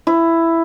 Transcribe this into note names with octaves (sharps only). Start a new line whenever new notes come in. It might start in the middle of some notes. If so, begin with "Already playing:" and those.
E4